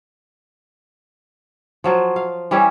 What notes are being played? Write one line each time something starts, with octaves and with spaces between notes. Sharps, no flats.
F3 F#3 F4
F5
E3 G3 C#4 E4